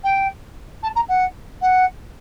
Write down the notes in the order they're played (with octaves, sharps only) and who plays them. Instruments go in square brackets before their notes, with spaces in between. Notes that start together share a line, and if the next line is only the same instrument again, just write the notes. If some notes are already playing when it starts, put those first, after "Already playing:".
[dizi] G5
A5
A#5
F#5
F#5